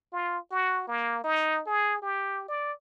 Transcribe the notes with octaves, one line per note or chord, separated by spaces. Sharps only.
F4
F#4
A#3
D#4
G#4
G4
D5